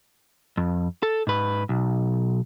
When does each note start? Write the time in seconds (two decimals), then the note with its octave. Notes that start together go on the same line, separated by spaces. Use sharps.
0.57 F2
1.03 A4
1.27 G#2 B4
1.69 B1